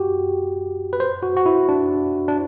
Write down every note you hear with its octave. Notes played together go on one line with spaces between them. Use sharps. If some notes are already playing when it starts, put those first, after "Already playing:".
Already playing: F#4 G4
B4
C5
F#4
F#4
E4
D4
D4